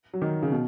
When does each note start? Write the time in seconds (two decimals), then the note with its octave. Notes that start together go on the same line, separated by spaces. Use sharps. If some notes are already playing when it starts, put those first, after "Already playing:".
0.13 F#3
0.22 D#3
0.42 C#3
0.52 B2